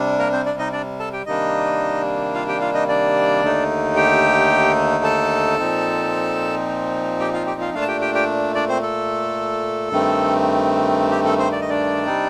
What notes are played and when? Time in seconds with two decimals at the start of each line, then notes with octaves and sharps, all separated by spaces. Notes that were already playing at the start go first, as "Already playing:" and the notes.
Already playing: C3 G3 D4
0.19 A#3 A#4
0.32 C4 C5
0.45 D4 D5
0.59 D#4 D#5
0.73 D4 D5
1.00 A4 A5
1.13 G4 G5
1.26 C3 D#3 G3 A#3 D4 D#4 D#5
2.34 F4 F5
2.48 G4 G5
2.61 F4 F5
2.74 D#4 D#5
2.88 D4 D5
3.42 D#2 D3 A3 D#4
3.96 G4 G5
5.04 A4 A5
5.59 A#2 F3 C4 D#4
7.20 G4 G5
7.33 F4 F5
7.47 G4 G5
7.60 F4 F5
7.74 A#2 A3 D4 F4 F5
7.82 A5
7.88 G4 G5
8.01 G4 G5
8.14 G4 G5
8.55 D4 D5
8.68 C4 C5
8.82 A4
9.91 G2 D#3 A3 C4
11.11 G4
11.25 A4
11.38 C4 C5
11.52 D5
11.61 D#5
11.69 D4 D5
12.05 C3 G3 C4 D#4